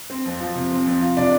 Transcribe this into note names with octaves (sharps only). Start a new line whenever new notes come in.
C4
F2
F3
C3
C4
F2
F4
C3 D4 D5